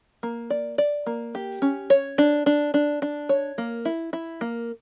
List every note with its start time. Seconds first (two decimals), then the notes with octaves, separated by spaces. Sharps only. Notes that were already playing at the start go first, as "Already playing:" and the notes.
0.23 A#3
0.50 D5
0.78 D5
1.06 A#3
1.35 G4
1.62 C#4
1.90 C#5
2.18 D4
2.46 D4
2.74 D4
3.02 D4
3.29 C#5
3.58 A#3
3.85 E4
4.13 E4
4.41 A#3